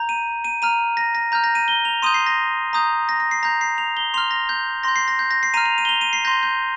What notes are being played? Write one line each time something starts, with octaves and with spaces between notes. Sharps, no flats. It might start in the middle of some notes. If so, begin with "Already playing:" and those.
Already playing: A#5 G6
D#7
D#7
A#5 F6 D#7
A#6
A#6
A#5 F6 G6
A#6
D#7
G7
F7
C6 D#6 G6 D#7
C7
A#6
A#5 D#6 G6
A#6
A#6
C7
A#5 G6 A#6
C7
F7
G7
C6 F6 F7
A#6
G6
C6 G6 A#6
C7
A#6
G6
A#6
C7
A#5 F6 D#7
F7
D#7
G7
F7
D#7
C7
C6 G6 A#6
G6